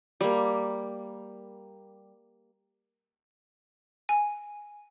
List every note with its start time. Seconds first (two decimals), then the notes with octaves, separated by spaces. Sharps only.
0.21 G3 A#3
4.09 G#5